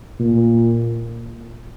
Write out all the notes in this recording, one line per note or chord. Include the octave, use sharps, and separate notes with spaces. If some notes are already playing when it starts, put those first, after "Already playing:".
A#2